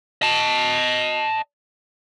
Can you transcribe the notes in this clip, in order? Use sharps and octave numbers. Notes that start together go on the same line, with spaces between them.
D#5 A5